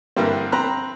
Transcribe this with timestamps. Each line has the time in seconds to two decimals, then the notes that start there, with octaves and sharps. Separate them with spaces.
0.16 G2 D3 E3 G3 A#3 C4
0.52 C4 A#5 B5 F#6